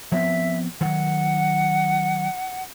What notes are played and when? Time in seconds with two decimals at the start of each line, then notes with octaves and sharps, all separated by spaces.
0.12 F3 B3 C4 E5
0.81 D#3 F#3 F#5